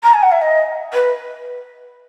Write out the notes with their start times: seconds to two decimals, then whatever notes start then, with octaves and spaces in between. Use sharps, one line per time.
0.03 A#5
0.14 G#5
0.23 F#5
0.31 E5
0.42 D#5
0.93 B4